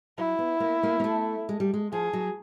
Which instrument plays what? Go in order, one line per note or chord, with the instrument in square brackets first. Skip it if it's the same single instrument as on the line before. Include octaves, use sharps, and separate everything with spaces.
[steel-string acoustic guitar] F#3 [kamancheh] E4
[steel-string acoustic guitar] B3
A#3
A#3
A#3
A3
G#3
G3
G#3
[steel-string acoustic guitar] F3 [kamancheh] G#4
[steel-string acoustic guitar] F#3